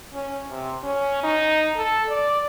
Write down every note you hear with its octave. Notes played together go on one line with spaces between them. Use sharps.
C#4
C3
C#4
D#4
A4
D5